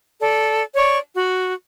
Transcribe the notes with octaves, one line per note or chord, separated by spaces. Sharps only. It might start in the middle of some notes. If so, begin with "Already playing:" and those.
A4 D5
C#5 D5 C#6
F#4